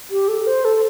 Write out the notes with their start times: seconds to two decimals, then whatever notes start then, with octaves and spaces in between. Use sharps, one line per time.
0.10 G4
0.28 A4
0.47 C5
0.65 A4